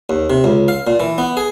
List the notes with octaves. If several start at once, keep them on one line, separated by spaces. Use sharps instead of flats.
D#2
C3
C#2
F5
A#2
E3
B3
G#4